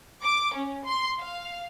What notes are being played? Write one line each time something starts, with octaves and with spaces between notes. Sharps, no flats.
D6
C#4
C6
F5